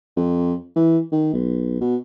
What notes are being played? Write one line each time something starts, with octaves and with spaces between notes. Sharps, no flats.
F2
E3
D#3
B1
B2